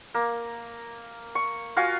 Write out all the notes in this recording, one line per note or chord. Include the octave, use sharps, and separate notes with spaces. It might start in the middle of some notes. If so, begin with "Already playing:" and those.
A#3
C#6
F4 F#4 F5 G#5